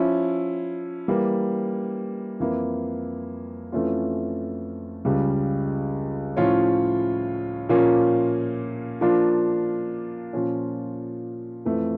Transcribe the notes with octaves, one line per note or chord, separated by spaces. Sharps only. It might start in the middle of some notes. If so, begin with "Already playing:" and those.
Already playing: F3 C#4 E4
E3 G3 A#3
F2 E3 A#3 E4
F2 E3 A3 C#4 F4
C#2 C#3 G3
A2 F3 C#4 F4 C#5
A#2 F3 A#3 C#4
F3 A#3 D4 F4
A#2 F3 C#4
F2 E3 A3